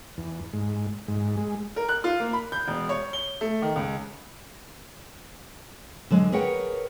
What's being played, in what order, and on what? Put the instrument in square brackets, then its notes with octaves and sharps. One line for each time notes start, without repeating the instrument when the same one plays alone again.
[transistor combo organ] E2
G#2
G#2
G#3
[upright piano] A#4
F#6
F4
A#3
B5
G6
E1
C#5
G7
A3
D#3
C#2
[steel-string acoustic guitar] D3 F#3 G#3
G#4 A#4 B4 C#5 F#5 G5